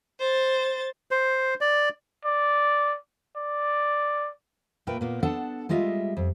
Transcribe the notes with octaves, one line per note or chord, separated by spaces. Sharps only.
C5 A6
C5
D5
D5
D5
A#2 A3 A#4 B4 G5
A#2 A#3 B3
B3 D4 A4 F#5 A5
G3 G#3 F4 D#5 E5
F2